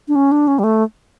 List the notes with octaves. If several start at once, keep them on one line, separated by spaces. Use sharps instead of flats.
D4
C#4
D4
C#4
G3
A3